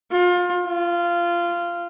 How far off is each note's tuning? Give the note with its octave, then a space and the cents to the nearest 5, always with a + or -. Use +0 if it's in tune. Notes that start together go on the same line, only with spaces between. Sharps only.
F4 +30
F4 -15